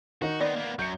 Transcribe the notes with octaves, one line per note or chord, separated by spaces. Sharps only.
D#3 D#4 F#4
B3 C4 D5
A#3 B3
F#2 F#3 G6 C#7